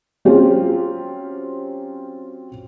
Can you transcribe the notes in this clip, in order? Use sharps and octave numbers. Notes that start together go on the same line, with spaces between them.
F#3 C4 C#4 F4 G4